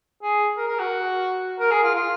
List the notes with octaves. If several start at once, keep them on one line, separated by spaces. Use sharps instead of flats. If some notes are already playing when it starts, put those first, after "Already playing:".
G#4
A#4
A#4
F#4
A#4
G#4
F4
F4